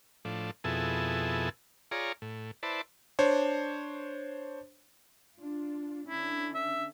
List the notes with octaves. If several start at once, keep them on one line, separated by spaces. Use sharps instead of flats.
A2 F3 D4
F2 B2 E4 G#4 A4
F4 G#4 C#5 D5 A#5
A2
E4 B4 C5 D5 A5
D4 C5 C#5
D4 F4
D3 C#4 D4 E4
E5